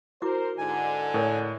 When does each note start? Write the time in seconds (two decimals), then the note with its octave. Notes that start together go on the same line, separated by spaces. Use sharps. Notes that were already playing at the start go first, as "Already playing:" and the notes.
0.22 E4 F#4 A#4 C5 D6
0.58 G#2 D3 G#5
1.14 A2 C#4 A#4 C#5